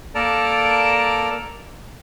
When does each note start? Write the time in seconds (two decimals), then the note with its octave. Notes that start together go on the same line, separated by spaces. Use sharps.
0.15 A#3 A4 A#4 D5 A5 A#5